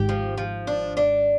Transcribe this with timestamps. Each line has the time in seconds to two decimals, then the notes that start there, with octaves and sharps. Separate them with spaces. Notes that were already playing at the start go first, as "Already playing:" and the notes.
Already playing: G#1 G#2 G4
0.09 F3
0.38 F3
0.67 D4
0.97 D4